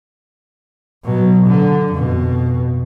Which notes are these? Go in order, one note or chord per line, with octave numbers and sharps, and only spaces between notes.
B2 F#3
D3
F2 B2